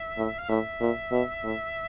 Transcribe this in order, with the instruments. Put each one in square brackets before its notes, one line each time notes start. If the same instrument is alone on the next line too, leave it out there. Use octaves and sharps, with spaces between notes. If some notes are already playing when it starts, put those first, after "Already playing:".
Already playing: [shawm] E5
[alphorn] A2
[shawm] F5
[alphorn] A2 [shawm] E5
[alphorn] A#2
B2
A2